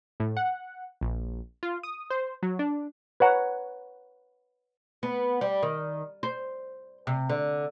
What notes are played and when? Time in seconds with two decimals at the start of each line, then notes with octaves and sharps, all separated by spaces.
0.20 A2
0.37 F#5
1.01 A#1
1.63 F4
1.83 D#6
2.10 C5
2.43 F#3
2.59 D4
3.20 B4 C#5 F#5 A#5
5.03 B3
5.41 G3
5.63 D#3
6.23 C5
7.07 C3
7.29 D3